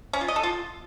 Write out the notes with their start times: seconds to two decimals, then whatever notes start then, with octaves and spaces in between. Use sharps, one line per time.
0.13 C#4
0.21 F4
0.28 D#5
0.36 A4
0.43 F4